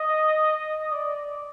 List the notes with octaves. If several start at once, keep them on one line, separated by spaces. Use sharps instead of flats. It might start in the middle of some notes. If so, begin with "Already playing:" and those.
Already playing: D#5
D5